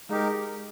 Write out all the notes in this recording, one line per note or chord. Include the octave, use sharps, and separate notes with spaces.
G#3 D#4 G4 G#4 A#4